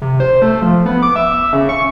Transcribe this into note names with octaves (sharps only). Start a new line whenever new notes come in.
C3
C5
A3
F3
B3
D6
E5
C#3
C#6